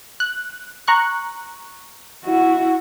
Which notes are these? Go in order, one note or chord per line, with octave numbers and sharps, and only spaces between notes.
F#6
A#5 C#6 F#6
E4 F#4